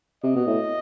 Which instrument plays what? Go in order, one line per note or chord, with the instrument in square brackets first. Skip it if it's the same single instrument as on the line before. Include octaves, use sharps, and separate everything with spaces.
[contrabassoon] C3 [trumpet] D#5
[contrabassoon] B2
A2